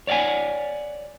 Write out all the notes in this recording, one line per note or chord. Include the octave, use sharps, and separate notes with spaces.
C#5 D5 F5 F#5 G#5